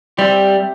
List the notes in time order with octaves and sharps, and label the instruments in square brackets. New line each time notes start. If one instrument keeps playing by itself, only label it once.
[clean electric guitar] G3 [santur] C4 G4 C5 E5